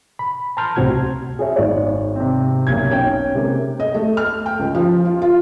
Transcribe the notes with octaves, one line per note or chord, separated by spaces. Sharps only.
B5
A5 A#5 C6 F6 G6
C#2 A2 C3 C4 F#4 G#6
G#4 C#5 E5
G#1 C#5 D5
C3 C4
F#1 B1 G#6
C#4 D#4 G5
C3 G#3 A#3
D#5
A3
F6
G5
C#2
F3
F4
F4